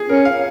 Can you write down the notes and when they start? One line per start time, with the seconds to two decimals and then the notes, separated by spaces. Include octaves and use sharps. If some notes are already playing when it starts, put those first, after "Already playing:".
Already playing: G#4
0.09 C#4 A#4
0.25 F5